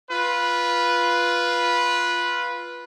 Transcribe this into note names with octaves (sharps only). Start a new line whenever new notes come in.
F4 B4